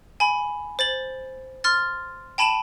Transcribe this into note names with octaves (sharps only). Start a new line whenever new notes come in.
G#5 B5
C5 A6 F#7
C6 F6 A6
G5 A5 B5 D#7 E7 F#7